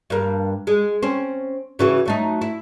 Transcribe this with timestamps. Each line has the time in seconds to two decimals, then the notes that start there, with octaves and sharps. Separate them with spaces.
0.10 G2 A#3
0.67 G#3
1.02 C4 C#4
1.79 C#3 E3 F#4
2.06 F#3 A3 D#4
2.41 E4